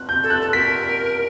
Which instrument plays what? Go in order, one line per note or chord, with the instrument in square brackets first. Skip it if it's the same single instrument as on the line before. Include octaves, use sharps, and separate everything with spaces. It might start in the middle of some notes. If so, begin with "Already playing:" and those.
Already playing: [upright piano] F#6
G6
[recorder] A4
[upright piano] F#6
[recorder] A4
[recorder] A#4 [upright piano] B6